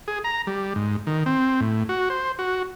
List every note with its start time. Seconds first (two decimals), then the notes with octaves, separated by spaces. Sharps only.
0.08 G#4
0.24 A#5
0.47 G3
0.76 G#2
1.07 D#3
1.26 C4
1.60 A2
1.89 F#4
2.10 C5
2.39 F#4